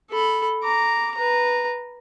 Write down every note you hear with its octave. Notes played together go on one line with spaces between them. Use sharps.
A4 B5
A#5 D6
B4 A#5